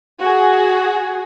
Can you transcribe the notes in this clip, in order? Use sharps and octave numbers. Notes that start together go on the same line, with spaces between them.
F#4 G#4